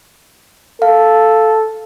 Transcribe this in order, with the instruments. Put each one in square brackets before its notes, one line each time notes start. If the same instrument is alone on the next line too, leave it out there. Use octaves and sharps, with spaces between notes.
[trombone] A4 [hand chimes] F5